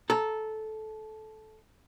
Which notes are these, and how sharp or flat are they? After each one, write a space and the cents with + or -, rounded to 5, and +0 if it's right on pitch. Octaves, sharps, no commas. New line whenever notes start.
A4 -15 A#5 -20